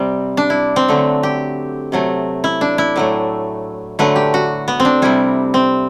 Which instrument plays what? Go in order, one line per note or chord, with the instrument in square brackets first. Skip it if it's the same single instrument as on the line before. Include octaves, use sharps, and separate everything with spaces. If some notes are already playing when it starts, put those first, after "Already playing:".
Already playing: [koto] C3 G3 C4
D4
E4
C4
D3 F#3 A3
G4
C3 F#3 A3
E4
D4
E4
A2 F#3 A3
D3 F#3 A3 B4
G4
F#4
B3
C4
D4
C3 G3 E4
C4